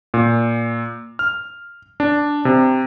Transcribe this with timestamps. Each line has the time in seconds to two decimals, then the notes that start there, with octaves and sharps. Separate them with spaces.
0.14 A#2
1.19 F6
2.00 D4
2.45 C3